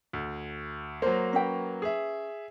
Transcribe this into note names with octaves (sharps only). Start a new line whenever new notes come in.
D2
F#3 A#3 C5
C#4 B4 G5
G#4 E5